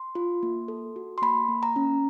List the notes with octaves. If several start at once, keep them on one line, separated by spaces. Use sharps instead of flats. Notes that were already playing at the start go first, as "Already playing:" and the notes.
Already playing: C6
F4
A#3
A4
F#4
C6
A#3 B5
A#3
A#5
C#4